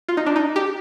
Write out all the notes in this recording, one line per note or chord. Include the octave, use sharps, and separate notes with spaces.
F4
D#4
D4
D#4
G4